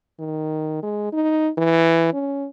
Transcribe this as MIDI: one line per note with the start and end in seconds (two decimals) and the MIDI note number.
0.20 0.79 51
0.83 1.11 56
1.12 1.49 63
1.58 2.11 52
2.13 2.47 61